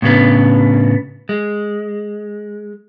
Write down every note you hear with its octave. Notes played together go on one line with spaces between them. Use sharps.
A2 C#3 B3 D4
G#3